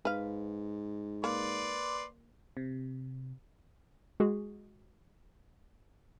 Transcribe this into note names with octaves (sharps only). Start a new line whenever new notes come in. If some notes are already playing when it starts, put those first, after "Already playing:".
G#2 B4 F5
A#3 B4 D5 C6
C3
G#3 F#4 G#4